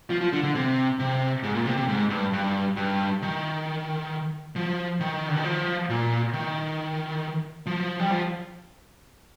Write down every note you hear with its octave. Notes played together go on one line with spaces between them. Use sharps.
F3
F3
D3
D3
C3
C3
G#2
A#2
C3
C3
G#2
G2
G2
G2
D#3
F3
D#3
D3
D#3
F3
A#2
D#3
F3
G3
F3